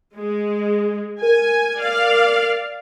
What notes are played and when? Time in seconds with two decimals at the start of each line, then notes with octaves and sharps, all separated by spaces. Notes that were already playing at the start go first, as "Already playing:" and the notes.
0.16 G#3
1.22 A#4 G#5
1.78 D5 F5